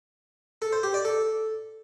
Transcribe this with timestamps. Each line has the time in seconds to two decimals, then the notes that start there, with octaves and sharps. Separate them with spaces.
0.62 A4
0.73 C5
0.83 G4
0.94 D5
1.05 A4